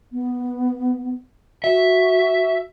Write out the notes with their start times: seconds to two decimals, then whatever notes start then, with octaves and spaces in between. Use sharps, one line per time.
0.12 B3
1.64 F#4 E5